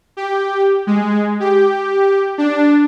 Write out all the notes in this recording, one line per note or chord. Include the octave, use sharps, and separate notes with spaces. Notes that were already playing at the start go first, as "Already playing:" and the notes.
G4
G#3
G4
D4